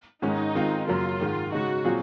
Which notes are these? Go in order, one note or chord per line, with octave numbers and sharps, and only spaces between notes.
G#2 D#3 G#3 C#4 D#4
D#3 G#3 C4 F4
F#2 C#3 F#3 A#3 F4
G#2 D#3 G#3
C#3 G#3 D#4 F#4
A#2 F#3 C4 F4 G#4